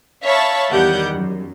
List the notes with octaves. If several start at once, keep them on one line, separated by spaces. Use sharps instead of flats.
C#5 E5 F5 A5 B5 C#6
E2 D#3 G3 G4 F#5 G6
F#2